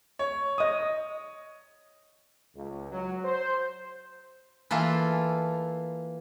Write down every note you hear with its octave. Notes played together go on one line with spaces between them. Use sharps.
C#5
D#5 D#6
C#2
F#3
C5
E3 A#3 F4 A4